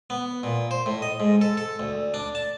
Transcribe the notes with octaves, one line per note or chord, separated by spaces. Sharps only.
B3
A#2
C5
A2
D#5
G#2
A4
A4
D2
D4
A5